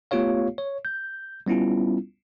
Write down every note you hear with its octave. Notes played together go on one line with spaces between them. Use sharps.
A3 B3 F4 G4 C#5 F5
C#5
G6
G3 B3 C#4 E4 F4